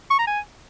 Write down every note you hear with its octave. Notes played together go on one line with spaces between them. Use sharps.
C#6
A#5
G#5